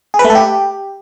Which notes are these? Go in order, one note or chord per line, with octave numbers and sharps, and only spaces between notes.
G#4
B4
A3
A4
G4